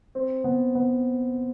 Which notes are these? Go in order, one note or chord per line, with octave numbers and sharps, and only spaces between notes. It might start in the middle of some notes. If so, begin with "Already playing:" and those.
C4
B3
B3